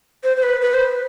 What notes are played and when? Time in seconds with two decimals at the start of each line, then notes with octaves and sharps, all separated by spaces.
0.24 C5
0.37 C5
0.43 B4
0.62 B4
0.74 C5